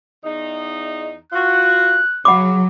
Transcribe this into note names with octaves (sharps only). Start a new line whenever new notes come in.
E2 D#4
F4 F#4 F#6
C#3 F#3 F#5 B5 D6